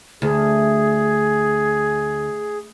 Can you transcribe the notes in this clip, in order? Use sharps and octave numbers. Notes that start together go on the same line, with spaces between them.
D2 G#4